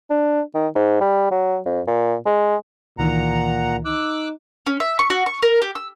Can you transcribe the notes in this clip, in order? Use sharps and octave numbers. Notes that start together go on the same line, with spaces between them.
D4
D#3
G#2
G3
F#3
F2
A#2
G#3
C#2 A#2 D#3 E3 F#5 A#5
D#4 D6 E6 F#6
C#4
E5
C#6
F#4
C#6
A#4
G4
E6